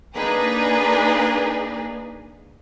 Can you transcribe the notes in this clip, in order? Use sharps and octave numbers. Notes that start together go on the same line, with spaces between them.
A#3 D4 D#4 G#4 B4